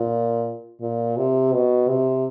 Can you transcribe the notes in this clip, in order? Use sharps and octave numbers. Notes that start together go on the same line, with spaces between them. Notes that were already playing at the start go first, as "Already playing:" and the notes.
Already playing: A#2
A#2
C3
B2
C3